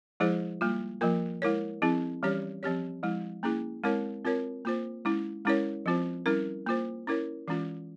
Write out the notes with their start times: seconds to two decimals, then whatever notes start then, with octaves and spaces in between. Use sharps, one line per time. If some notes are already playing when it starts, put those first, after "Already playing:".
0.20 F3 G#3 E4 G#4 C5
0.61 G3 A#3 F4
1.01 F3 A#3 F4 A#4
1.42 G#3 E4 A#4 C#5
1.82 F3 C4 E4 G#4
2.23 E3 G3 C#4 G4 C#5
2.63 F3 C4 G4 C#5
3.03 F3 G#3 E4
3.43 A#3 C#4 E4 G#4
3.84 G#3 C4 E4 A#4 C#5
4.25 C4 F4 A#4 C#5
4.65 A#3 F4 C5
5.05 G#3 C#4 E4
5.45 G#3 C#4 E4 A#4 C#5
5.86 F3 C4 F4 C5
6.26 G3 C#4 E4 A#4
6.66 A#3 F4 C5
7.07 C#4 E4 A#4 C#5
7.48 E3 G#3 C#4 F4